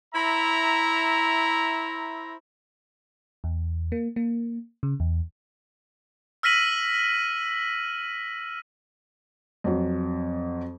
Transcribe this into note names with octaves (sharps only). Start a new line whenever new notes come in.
E4 C5 E5 A#5
E2
A#3
A#3
C#3
E2
E6 F6 A#6 B6 D#7 F#7
F2 F#3